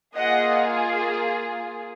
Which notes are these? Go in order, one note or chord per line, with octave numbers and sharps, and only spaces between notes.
A#3 F4 G#4 D#5 F#5